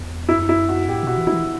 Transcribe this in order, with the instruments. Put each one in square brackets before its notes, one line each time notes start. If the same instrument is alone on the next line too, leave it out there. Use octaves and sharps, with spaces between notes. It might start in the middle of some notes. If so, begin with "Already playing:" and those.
Already playing: [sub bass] E2
[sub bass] F#2 [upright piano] E4
[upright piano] E4
F#4
[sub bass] A2 [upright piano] G4
[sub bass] B2 [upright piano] F#4
[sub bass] E3
[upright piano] E4
[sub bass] E3